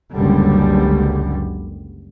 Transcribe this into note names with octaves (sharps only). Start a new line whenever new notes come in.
F#1 C#2 F#2 D3 G3